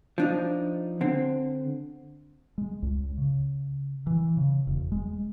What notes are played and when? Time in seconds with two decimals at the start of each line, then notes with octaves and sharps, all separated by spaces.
0.18 F3 D4 D#4
1.01 D3 C4
2.58 G#3
2.82 C#2
3.18 C#3
4.07 E3
4.37 C#3
4.67 E1
4.92 G#3